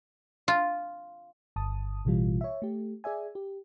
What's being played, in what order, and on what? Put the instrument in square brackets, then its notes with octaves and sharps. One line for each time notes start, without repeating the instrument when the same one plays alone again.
[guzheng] F4
[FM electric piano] G1 A5 D#6
A1 B2 E3 G3 F4
C#5 E5
A3 G4
G#4 D5 E5 G#5
G4